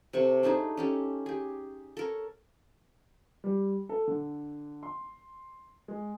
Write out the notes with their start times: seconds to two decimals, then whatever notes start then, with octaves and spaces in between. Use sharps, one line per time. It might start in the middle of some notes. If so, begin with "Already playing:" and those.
0.13 C3 A3 C#6
0.43 A3 D4 D#4 G#4
0.77 C#4 G4 A4
1.26 G4 G#4
1.97 A4 A#4 C#5
3.44 G3
3.89 A4
4.07 D3
4.83 C6
5.88 G#3